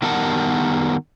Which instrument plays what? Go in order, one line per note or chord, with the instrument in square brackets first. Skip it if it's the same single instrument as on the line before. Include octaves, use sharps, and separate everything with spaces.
[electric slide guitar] D#3 G3 B3 A#4 F#5 A5